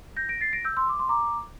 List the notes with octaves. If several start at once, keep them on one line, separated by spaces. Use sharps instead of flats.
G6 A#6
A#6 D7
A6 C7
A#6 D7
E6 G6
C6 E6
D6
C6
A#5 D6